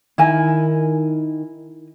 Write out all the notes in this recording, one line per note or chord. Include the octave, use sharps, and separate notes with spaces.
D#3 E4 A#4 G#5